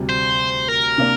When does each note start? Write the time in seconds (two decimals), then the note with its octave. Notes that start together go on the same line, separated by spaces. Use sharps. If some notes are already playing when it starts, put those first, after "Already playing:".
Already playing: D2 C3 G3
0.09 C5
0.68 A#4
0.98 C3 A#3 D4